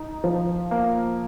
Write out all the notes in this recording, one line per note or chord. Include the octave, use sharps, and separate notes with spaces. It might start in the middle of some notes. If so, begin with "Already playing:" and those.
Already playing: D#4
F3
A#3